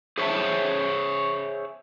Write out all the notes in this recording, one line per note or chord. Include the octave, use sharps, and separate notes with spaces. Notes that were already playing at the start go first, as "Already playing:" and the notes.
G#4 C5 C#5 D#5 E5 A5